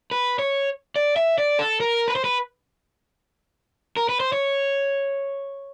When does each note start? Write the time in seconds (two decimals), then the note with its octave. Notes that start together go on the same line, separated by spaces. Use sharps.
0.11 B4
0.39 C#5
0.96 D5
1.16 E5
1.38 D5
1.59 A4
1.80 A#4
2.08 B4
2.16 C5
2.24 B4
3.97 A#4
4.09 B4
4.20 C5
4.32 C#5